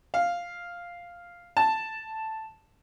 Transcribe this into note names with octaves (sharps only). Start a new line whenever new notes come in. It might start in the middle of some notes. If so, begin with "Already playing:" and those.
F5
A5